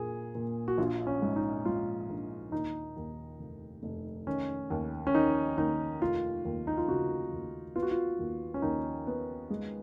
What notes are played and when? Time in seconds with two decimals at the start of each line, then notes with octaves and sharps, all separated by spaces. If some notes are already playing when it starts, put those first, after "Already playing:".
Already playing: A#2 A#3 G#4
0.35 A#2
0.68 F#4
0.78 A#1 F4
1.07 C#4
1.22 G#2
1.36 D#4
1.65 G#2 F4
2.09 A#1
2.52 D#2 D#4
2.97 D#2
3.40 F1
3.83 F1
4.27 D#3 C#4
4.70 D#2
5.07 C#4
5.14 D#3 D#4
5.57 D#2 D#4
6.01 F1 F4
6.45 D#2
6.67 D#4
6.77 F4
6.88 C#3 F#4
7.32 D#2
7.76 B3 F4
7.83 F#4
7.91 F4
8.19 D#2
8.54 C#4
8.62 D#2 D#4
9.07 B3
9.50 G#3